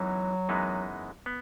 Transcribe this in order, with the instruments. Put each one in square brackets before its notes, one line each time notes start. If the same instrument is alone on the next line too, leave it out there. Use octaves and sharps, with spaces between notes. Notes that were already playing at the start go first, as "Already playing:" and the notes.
Already playing: [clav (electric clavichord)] F#2 E3 G#3 B3 D#4 [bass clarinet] F#3
[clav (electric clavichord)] F#2 E3 G#3 B3 D#4
B3